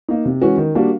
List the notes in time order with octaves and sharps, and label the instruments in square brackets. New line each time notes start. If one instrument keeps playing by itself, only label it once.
[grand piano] A#3 D#4
C3
E3 G#3 C#4 F#4
D#3
G3 A#3 D4 F#4